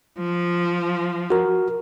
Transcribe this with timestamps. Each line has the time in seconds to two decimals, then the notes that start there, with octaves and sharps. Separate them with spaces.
0.19 F3
1.30 F#4 A#4